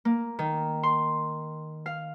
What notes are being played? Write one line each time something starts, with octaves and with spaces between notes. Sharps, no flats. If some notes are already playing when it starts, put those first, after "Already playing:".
A#3
D#3
C6
F5